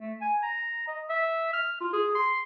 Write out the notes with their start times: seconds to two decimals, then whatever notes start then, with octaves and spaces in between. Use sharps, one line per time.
0.01 A3
0.21 G#5
0.43 A#5
0.88 D#5
1.09 E5
1.53 F6
1.81 F4
1.93 G#4
2.15 C6